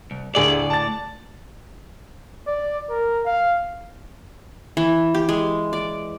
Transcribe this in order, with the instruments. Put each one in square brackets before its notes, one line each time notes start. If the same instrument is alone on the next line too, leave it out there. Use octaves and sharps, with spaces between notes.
[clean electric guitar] C2
[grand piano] D2 G#4 F#7 [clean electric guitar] A2 D5
[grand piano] A5 A6
[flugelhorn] D5
A#4
F5
[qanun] E3
G4
G#3
D5